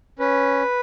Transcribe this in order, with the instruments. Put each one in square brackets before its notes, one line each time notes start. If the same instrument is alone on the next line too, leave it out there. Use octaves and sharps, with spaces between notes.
[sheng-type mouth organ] C#4 B4